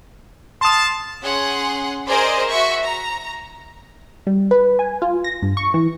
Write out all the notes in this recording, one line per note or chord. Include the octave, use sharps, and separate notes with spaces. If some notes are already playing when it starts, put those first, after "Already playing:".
F5 A5 C6 D#6
C#4 G#4 F#5 C6
G#4 A#4 C5 D5 D#5
F#4 E5 C#6
A#5
G3
B4
G#5
F4
A#6
G2
C#6
E3